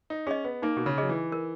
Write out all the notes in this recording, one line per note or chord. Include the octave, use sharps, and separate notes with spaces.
D#4
C#4 G#4 D#5
B3
A#3 D#4
B2
C#3
F#3 G#4 D#5
E3
A#4